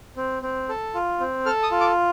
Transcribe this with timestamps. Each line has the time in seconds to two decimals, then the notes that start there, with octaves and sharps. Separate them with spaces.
0.16 C4
0.42 C4
0.69 A4
0.94 F4
1.20 C4
1.46 A4 F6
1.63 D#6
1.71 F4
1.81 D6